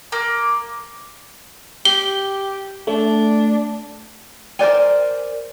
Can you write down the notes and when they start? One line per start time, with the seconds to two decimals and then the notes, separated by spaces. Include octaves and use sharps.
0.12 A#3
1.85 G4 G7
2.87 A3 D4
4.59 A#4 C5 D5 G#5